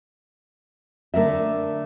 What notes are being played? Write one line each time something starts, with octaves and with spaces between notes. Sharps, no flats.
D3 A3 A#4 E5